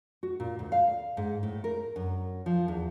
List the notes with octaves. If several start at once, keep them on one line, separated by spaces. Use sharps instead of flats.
F#4
A#2
D2
F5
G#2
A2
A#4
F#2
F3
E2